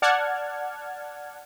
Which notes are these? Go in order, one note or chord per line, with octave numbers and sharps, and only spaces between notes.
D5 F#5 A5 F6 G#6